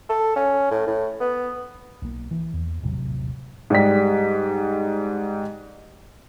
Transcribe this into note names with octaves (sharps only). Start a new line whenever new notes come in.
A4
C#4
A2
A2
B3
B1 A#3
E3
E2
D#1 A1 C3 F#3
G#2 G3 B6